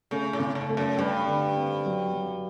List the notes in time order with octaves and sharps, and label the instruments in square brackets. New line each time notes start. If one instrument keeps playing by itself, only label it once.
[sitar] C#3 [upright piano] A3
[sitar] A2
[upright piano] C#3
[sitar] G#2
[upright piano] A3
[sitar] F#2
[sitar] G2 [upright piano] G3
[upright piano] D3
C4
F#3
F#3